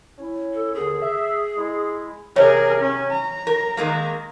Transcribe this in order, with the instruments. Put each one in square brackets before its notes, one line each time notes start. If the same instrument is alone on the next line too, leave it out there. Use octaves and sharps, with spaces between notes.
[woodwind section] C#4 E4
[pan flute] A4
[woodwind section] D#2 D3 [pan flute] G#4
[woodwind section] E5
G#3 E4
[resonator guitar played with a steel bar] C3 [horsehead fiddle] G#4 A#4 [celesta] C#5
[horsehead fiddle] C#4
A#5
[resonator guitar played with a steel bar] A#4
D#3 G#3 A#3